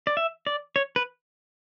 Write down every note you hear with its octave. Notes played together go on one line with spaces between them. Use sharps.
D5
E5
D5
C#5
B4